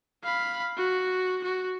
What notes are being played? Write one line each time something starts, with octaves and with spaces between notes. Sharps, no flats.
F5 B5
F#4
F#4